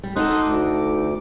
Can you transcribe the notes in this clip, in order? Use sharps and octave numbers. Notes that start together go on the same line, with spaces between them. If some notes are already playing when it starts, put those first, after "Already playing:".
G3
D#4 F#4 A4 C6 D#6 F#6
D2 D6